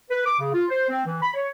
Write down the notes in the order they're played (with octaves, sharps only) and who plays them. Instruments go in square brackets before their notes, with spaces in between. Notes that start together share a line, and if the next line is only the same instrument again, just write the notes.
[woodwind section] B4
D6
C#3
F4
C5
C4
E3
B5
C#5